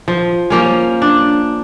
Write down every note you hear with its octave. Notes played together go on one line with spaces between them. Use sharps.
F3
F3 A#3 C#4
D4